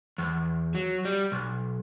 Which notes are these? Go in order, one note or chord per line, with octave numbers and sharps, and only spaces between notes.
E2
F#3
G3
B1